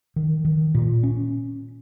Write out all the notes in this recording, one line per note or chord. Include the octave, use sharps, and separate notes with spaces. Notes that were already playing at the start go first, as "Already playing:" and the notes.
D#3
D#3
A#2
C#4